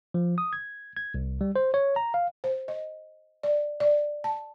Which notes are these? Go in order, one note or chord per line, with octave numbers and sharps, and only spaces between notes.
F3
D#6
G#6
G#6
C2
G3
C5
C#5
A#5
F5
C5
D#5
D5
D5
A5